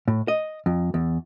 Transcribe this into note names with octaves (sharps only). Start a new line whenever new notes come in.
A2
D#5
F2
E2